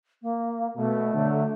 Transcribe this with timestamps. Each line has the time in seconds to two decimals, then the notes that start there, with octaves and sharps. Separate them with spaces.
0.22 A#3
0.76 B2 A3
1.14 D3 F#3